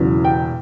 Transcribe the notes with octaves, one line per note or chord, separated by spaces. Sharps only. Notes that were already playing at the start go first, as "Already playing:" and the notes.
Already playing: E1 E2 C#3 F#3
G5